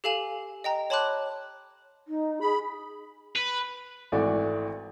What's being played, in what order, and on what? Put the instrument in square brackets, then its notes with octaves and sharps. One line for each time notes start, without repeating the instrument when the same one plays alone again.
[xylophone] G4 A4 F5 G#5 E7
D#5 G5 A#5
C#5 A5 B5 C6 D6 F#6
[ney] D#4
[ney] G#4 [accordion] B5
[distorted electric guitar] B4
[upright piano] G#1 E3 A3 F#4 D5